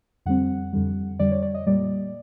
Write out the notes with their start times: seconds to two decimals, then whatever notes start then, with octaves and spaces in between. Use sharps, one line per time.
0.26 F2 D3 G3 C4 F#5
0.73 F2 D3 G3
1.19 F2 D3 G3 D5
1.31 C#5
1.43 D5
1.54 D#5
1.66 A#2 G3 A#3 D5